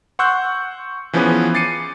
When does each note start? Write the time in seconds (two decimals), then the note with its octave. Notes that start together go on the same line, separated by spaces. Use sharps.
0.19 F#5 C6 C#6 E6 F#6 G6
1.13 E3 F3 B3 C#4 G#4 B4
1.54 D6 A6 C7 C#7 D#7